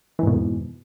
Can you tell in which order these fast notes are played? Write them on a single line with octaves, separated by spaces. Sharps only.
E3 G#2 B2 D#3 F2